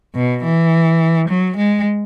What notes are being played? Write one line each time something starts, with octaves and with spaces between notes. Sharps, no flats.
B2
E3
F#3
G#3